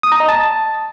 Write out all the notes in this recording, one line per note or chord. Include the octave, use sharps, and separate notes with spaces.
D#6
A#5
D#5
A5